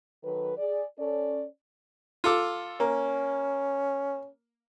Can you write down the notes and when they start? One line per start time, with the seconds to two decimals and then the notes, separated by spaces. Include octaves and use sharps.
0.24 D#3 F#3 A4 B4
0.58 G#4 D5
0.99 C#4 A4 D5
2.24 F4 A4 D6
2.80 A#3 C#4